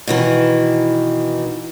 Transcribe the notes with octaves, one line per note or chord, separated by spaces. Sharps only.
B2 D#3 E3